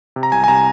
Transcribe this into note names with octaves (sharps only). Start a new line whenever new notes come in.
C3
A#5
C2 G#5
G#5
C3 A#5